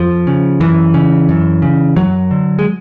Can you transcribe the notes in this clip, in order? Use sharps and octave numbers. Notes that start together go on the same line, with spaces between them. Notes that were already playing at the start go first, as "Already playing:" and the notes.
Already playing: F2 F3
C#3
F#2 E3
C#3
F#2
C#3
F#2 F#3
D3
G#3